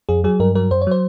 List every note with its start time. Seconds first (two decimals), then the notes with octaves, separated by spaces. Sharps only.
0.09 F2 G#4
0.24 F#3 G#4
0.40 G2 A#4
0.55 F#3 A#4
0.71 F#2 C5
0.82 C#5
0.87 F#3 C5